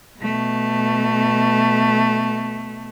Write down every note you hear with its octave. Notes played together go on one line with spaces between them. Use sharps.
B2 A3